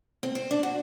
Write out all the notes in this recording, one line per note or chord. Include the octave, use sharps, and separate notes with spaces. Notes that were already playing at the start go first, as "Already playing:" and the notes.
C4
C5
D4
F#4